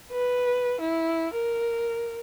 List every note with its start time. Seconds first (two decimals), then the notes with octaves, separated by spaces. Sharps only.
0.12 B4
0.81 E4
1.33 A#4